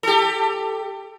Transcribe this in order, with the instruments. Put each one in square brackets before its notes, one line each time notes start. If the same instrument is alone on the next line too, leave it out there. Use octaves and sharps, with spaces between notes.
[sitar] G4 A4